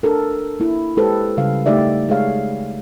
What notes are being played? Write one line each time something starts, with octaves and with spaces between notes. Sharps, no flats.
D4 A4 A#4
A#3 E4
G#3 G4 A4 B4 C5
C#3 G3 F5
A3 D#4 G4 D5 E5
G#3 G#4 C#5 F5